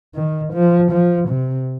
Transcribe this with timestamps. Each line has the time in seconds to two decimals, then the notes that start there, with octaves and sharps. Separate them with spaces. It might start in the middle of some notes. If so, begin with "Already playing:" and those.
0.15 D#3
0.54 F3
0.92 F3
1.29 C3